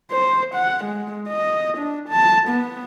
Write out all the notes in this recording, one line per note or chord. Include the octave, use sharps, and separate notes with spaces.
C5
F#5
G#3
D#5
D4
A5
B3